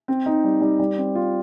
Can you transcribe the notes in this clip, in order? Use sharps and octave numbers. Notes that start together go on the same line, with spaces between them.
C4
D#4
G3
G3
G3
C4
F4